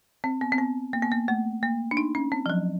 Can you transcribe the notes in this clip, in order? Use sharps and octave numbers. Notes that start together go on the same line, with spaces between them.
C4
B3
C4
B3
A#3
B3
A#3
A3
A#3
D4
D#4
C#4
C4
F3
F#3